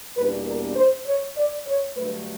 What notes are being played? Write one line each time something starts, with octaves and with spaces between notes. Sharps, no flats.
E2 B2 G3 A#3 D4 B4
A#4
C5
C#5
D5
C#5
G2 D3 F#3 A3 B4